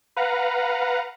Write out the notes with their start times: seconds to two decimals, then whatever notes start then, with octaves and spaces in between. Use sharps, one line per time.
0.17 B4 F5 F#5 A#5